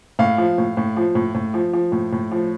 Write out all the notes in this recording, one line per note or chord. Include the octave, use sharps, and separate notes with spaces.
A2 F5
F3
A2
A2
F3
A2
A2
F3
F3
A2
A2
F3